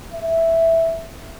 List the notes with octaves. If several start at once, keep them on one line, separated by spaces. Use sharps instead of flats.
E5